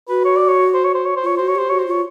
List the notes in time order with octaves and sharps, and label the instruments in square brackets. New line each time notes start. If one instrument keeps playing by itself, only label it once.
[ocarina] F#4 [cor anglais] B4
[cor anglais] C#5
D5
C#5
C5
C#5
C5
C#5
C5
[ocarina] F4 [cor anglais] C#5
[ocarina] F#4 [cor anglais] C5
[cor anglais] C#5
[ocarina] G4 [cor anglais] C5
[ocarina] F#4 [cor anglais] C#5
[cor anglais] C5
[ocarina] F4 [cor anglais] C#5